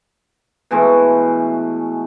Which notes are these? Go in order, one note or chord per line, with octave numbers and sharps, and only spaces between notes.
B2 E3 G#3 A3